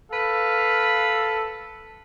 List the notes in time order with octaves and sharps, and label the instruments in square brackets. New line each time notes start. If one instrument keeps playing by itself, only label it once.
[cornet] A4 [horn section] B4 F5